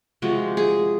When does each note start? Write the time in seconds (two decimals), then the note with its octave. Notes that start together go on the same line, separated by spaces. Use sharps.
0.22 C3 F3 G#3 F#4
0.57 G#4